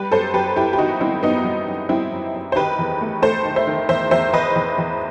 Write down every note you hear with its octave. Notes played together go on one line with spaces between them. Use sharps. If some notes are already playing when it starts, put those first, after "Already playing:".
Already playing: G3 G4 B4
F#2 A4 C5
F#2 G4 B4
F#2 E4 G4
G4
D#3 D#4 F#4
G3 C4 E4
F#2 B3 D#4
G3
F#2
G3 C4 E4
F#2
F#2
C5
D#3 G4 B4
E2
A3
A3 A4 C5
D#3
C5 E5
D#3
E2 C5 E5
E2 C5 E5
E2 B4 D#5
E2
E2